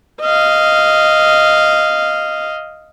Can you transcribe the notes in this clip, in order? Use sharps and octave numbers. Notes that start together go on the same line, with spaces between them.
D#5 F5